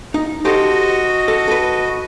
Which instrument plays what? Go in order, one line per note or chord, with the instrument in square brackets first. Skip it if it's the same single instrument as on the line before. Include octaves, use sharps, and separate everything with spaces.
[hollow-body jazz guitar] D#4
[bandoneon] F#4 D#5 [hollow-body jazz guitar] G4 A4 C5
[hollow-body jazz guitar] A4
A4 B4